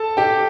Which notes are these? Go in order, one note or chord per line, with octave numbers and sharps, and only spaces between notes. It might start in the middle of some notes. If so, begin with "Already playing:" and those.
Already playing: A4 A5
G4 G5